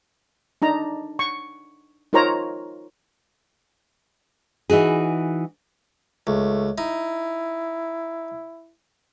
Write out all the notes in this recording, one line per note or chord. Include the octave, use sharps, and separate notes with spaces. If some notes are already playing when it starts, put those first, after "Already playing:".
D4 D#4 A#5
C#6
D#4 F4 A#4 C5 C#5 A#5
E3 D#4 F#4 G#4
C#2 A3
D#4 E4